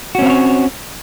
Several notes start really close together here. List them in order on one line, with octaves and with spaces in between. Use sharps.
F#4 C#4 C4 F5 C#5